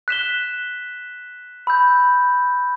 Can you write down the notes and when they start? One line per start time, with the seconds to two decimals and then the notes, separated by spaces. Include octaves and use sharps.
0.08 F#6 B6 E7 G7
1.67 B5 E6 G6